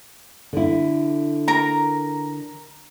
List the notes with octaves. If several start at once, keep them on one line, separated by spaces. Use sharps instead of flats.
D3 E4
A#4 A#5